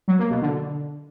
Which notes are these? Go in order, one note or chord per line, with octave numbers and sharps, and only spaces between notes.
F#3
A#3
B2
D3